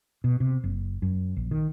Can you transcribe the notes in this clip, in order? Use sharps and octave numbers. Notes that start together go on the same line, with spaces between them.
B2
C3
F#1
F#2
A#1
D#3